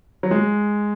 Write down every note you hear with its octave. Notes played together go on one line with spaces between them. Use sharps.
F#3
G#3